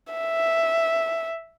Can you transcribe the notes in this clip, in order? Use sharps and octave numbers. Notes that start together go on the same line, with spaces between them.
E5